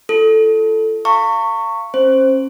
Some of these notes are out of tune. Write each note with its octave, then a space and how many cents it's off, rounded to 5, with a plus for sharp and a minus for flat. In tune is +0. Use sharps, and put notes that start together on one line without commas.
F4 -35 A4 +0
F5 -25 A#5 -45 C#6 +0
C#4 -35 C5 +0